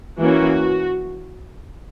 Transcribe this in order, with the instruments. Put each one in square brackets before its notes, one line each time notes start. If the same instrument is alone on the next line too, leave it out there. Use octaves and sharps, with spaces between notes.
[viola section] E3 A#3 C#4 F#4